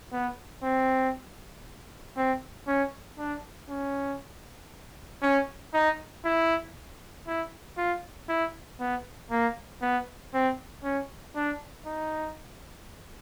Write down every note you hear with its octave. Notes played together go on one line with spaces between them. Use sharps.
B3
C4
C4
C#4
D4
C#4
C#4
D#4
E4
E4
F4
E4
B3
A#3
B3
C4
C#4
D4
D#4